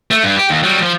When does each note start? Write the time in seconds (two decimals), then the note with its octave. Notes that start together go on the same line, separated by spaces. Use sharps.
0.11 A3
0.24 G2
0.37 G4
0.50 D#2
0.63 F#3 G3
0.83 F3